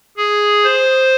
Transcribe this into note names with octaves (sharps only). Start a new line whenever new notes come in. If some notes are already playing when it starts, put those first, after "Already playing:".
G#4
C5